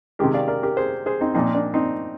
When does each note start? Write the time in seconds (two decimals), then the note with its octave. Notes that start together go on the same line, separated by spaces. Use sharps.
0.19 C3 D#3 G#3 G4 A#4
0.34 D5 F5
0.48 A#4 D5
0.63 G4 A#4
0.77 G#4 C5
1.06 G#4 C5
1.21 C4 D#4
1.34 A#2 F3 A#3 C4 D#4
1.55 D4
1.74 C4 D#4